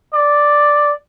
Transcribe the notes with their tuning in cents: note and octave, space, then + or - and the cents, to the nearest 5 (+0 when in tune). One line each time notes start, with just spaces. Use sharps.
D5 +0